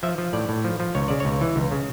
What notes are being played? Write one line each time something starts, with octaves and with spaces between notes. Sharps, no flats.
F3 E5
F3
A2 D5
A2
F3
F3
C#2 C#5
C#3 D5
C#2 C#5
E3
C#2
C#3